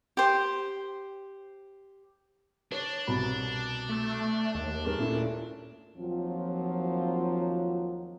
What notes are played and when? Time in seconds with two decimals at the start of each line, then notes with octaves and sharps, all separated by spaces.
0.17 G4 C5
2.72 D4 C#5
3.07 C2 B2 B5
3.89 A3
4.55 D#2
4.85 G2 G#4 A#4
4.98 A#2 A3 C#4 E4
5.98 D#2 F3 F#3 C4 F4